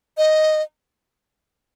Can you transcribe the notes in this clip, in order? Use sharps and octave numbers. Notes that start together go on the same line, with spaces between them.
D#5